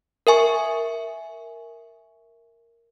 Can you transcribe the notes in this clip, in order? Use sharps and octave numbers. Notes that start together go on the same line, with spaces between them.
A#4 E5 G#5 C#6